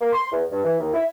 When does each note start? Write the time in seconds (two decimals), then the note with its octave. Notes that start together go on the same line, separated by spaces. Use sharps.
0.01 A#3
0.13 C6
0.32 E2
0.51 G2
0.65 E3
0.80 D#2
0.94 E4